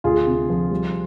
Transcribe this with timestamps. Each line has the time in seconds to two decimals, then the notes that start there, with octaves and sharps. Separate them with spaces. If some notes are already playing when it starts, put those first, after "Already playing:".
0.04 D2 F4 G#4
0.27 C3
0.49 F3
0.71 G3